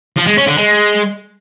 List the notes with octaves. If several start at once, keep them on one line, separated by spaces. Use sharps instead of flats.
F3
G#3
C#4
D3
G#3